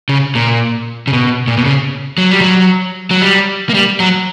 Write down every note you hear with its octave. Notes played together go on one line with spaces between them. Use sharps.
C#3
A#2
C#3
B2
A#2
B2
C#3
F#3
G3
F#3
F#3
G3
A#3
G3
F#3